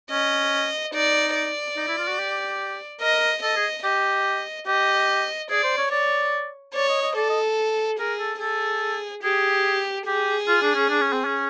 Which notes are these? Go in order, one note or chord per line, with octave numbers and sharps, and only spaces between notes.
C#4 D#5
D#4 D5
D5
D#4
E4
F4
F#4
G4
A#4 D#5
A4 D#5
G#4
G4 D#5
G4 D#5
G#4 D5
C5
C#5
C#5 D5
C#5 D5
D#5
D#5
A4 D5
D#5
G#4 A#4
A4
G#4 A4
G4 G#4
G4 G#4
F4
D4
C#4
D4
C#4
C4
C#4